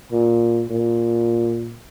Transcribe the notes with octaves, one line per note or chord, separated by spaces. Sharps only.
A#2
A#2